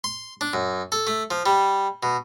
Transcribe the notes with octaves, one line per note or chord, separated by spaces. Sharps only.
C6
D4
F#2
A4
A3
F3
G3
B2